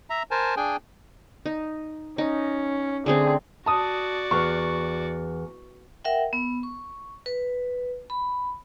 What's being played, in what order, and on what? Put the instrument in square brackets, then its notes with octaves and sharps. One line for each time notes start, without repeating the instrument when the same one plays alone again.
[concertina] E5 A#5
A#4 C5 G#5 A5
D4 G#4 G5 G#5
[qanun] D#4
[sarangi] C#4 [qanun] D#4
[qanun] D3 A3 C4 [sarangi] G#4
[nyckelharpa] F#4 D5 [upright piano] A5 D#6
[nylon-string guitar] E2 [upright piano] C#6
[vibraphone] A#4 E5 F#5 G5
B3
C#6
B4
B5